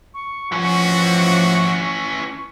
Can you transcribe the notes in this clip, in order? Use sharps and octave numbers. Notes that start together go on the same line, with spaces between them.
C#6
E3 F3 C#4 F#4